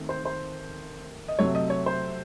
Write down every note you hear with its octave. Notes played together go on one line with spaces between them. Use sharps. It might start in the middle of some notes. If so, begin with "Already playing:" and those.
Already playing: D#3 A3 C4
C5
C5
D#5
C3 F#3 A3 C#5
D#5
C#5
C5